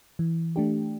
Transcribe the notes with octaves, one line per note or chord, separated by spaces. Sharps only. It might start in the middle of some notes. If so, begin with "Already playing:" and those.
E3
A3 D4 G4